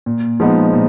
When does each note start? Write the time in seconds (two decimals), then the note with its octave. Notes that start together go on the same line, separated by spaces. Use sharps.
0.06 A#2
0.40 F3 G#3 B3 D#4
0.73 A#2